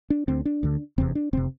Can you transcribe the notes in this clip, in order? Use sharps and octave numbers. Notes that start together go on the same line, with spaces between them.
D4
D2 D3 C4
D4
D2 D3
F1 E2 C3 C4
D4
F1 C3 C4